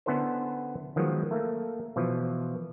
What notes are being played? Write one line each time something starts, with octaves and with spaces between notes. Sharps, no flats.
D3 B3 C#4 E4 A4 C5
D#3 F3 F#3 G#3 B3
A3 A#3
B2 E3 F3